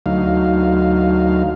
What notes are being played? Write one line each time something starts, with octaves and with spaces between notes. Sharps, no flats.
D2 F#3 D#4 F5